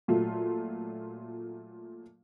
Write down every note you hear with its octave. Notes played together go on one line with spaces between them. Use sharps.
A#2 F#3 A3 F4